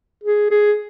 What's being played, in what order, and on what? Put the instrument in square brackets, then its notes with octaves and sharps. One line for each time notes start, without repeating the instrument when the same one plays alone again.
[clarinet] G#4
G#4